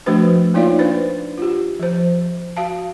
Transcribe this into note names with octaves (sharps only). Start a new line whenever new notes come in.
F3 A3 D4 F#4 B4 C5
A#3 D#4 F4 C#5 D5 F5
D4 B4 C5
F4 G4
F3 C5
F#4 F5 A5